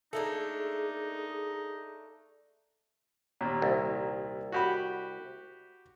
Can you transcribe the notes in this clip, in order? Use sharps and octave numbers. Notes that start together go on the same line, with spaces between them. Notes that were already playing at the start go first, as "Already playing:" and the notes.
A3 A#3 D4 D#4 G#4 A4
D#2 A#2
C2
F#4 G4 B5